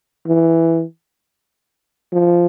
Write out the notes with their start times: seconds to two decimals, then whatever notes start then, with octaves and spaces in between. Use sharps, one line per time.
0.27 E3
2.13 F3